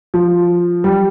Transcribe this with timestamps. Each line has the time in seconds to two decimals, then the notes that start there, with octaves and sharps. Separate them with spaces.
0.14 F3
0.84 G3